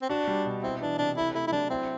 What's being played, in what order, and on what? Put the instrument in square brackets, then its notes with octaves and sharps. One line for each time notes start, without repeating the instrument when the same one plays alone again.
[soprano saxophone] C4
[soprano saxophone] D4 [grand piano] F#4
[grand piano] G3
B2
[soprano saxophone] C4 [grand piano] E4
[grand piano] E3 [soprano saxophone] D4
[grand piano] C3 [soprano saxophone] D4
[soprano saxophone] E4 [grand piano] A4
[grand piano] A3 [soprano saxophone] E4
[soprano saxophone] E4
[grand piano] F#3 [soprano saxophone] D4
[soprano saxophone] C4 [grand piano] E4